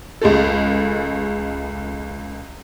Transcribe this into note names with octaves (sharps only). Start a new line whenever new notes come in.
C#2 G#3 A3 A4